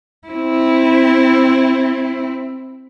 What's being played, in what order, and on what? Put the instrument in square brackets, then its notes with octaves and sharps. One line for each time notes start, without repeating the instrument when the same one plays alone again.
[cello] C4 E4